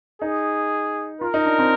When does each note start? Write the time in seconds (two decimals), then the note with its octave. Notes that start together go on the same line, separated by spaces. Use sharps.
0.22 D#4 G#4
1.21 F4 A#4
1.34 D#4
1.46 D4
1.59 C4